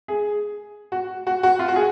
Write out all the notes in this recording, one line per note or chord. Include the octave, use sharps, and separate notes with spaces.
G#4
F#4
F#4
F#4
F4
F#4
G#4